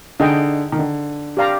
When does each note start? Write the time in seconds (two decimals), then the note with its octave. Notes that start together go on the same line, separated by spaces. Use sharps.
0.20 D3 D#4 G#4 D#5 G5
0.72 D#3
0.79 D3
1.37 G4 D5 F5 A#5